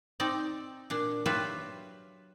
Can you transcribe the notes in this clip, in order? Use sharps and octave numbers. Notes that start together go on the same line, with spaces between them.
C4 D#4 D5
A#2 D4
F#3 F4 G4 B4 E5